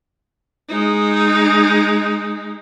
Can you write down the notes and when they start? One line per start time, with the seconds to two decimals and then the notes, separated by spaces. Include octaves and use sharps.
0.69 G#3 D#4